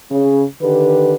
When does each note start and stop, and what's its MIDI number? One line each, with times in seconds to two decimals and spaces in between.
0.11 0.43 49
0.61 1.13 50
0.61 1.13 51
0.61 1.13 67
0.61 1.13 71